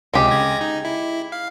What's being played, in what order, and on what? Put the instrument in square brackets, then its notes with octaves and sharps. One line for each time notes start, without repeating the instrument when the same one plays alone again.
[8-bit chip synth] C#2 C3 [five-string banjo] G#3 G4
[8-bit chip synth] C#3 G#6 A#6
D#4
E4
F5